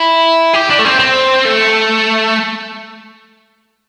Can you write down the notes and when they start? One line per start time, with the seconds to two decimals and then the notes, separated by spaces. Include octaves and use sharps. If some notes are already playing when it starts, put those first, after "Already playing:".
Already playing: E4
0.54 G4
0.70 D4
0.79 A3
0.85 C4
0.99 C4
1.45 A3